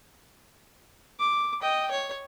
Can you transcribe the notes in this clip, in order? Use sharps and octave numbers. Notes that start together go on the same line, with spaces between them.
D6
D#5 G5
C#5